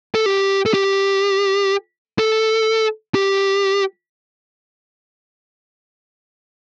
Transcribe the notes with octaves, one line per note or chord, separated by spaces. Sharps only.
A4
G4
A4
G4
A4
G4